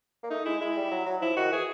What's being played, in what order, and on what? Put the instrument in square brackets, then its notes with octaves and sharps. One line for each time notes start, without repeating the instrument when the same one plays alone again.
[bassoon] A#3
[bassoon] A3 [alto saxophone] D#4
[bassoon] G#3 [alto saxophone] E4
[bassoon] G#3 [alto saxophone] E4
[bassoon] G3
F#3
F#3
[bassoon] F3 [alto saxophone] E4
[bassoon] D#3 [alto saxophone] F#4
[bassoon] E3 [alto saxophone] G#4